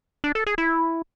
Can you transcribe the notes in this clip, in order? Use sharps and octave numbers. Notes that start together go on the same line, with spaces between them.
D4
A4
G#4
E4